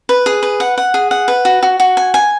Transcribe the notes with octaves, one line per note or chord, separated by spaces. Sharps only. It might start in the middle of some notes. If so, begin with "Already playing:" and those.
B4
G#4
B4
F#5
F#5
G#4
F#5
B4
F#4
F#4
F#4
G#5
G#5